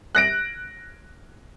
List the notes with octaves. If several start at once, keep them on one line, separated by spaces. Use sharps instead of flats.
F#6 A#6 D7